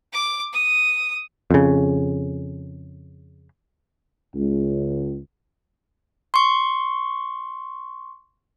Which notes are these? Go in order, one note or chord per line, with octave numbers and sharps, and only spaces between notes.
D6
D#6
F2 C#3
C#2
C6 C#6